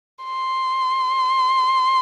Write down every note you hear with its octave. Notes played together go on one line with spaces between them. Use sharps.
C6